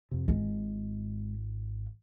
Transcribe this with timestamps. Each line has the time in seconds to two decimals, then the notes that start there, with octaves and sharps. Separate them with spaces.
0.11 F2 C3
0.28 G#1 G#3 F4